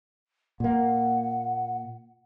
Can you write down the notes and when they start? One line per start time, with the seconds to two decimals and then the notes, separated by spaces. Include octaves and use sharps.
0.60 A#2 A#3 F#5